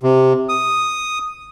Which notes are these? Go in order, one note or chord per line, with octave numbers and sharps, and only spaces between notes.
C3
D#6